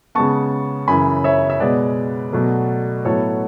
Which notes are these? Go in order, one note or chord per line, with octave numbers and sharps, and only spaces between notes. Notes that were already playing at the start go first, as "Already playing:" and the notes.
C#3 G#3 B3 A5 C#6
F#2 C#3 E3 G#5 B5
C#5 E5
E5
B2 G#3 B3 B4 D5
B2 F#3 A3
A2 F#3 B3 A4 C#5